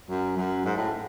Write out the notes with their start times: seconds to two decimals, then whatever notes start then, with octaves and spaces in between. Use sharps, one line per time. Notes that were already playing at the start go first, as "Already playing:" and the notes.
0.09 F#2
0.37 F#2
0.65 G#2
0.77 A2